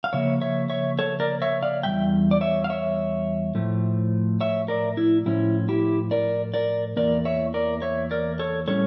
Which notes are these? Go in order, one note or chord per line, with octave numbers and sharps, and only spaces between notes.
F5
C#3 F3 A#3 C#5 E5
C#5 E5
C#5 E5
A4 C#5
A#4 D5
C#5 E5
D5 F5
E2 C#3 G3 E5 G5
D5
C#5 E5
F5
C#5 E5
A2 F3 A3
C#5 E5
A#4 D5
E4
A2 F3 C#4 E4
E4 G4
A#4 D5
A#4 D5
E2 E3 A#3 A#4 D5
C#5 E5
A#4 D5
C#5 E5
A#4 D5
A4 C#5
A2 G3 C#4 A4 C#5